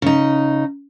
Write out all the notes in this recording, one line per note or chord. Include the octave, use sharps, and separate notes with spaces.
C#3 D#4